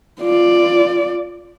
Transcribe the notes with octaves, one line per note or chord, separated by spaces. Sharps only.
F4 D5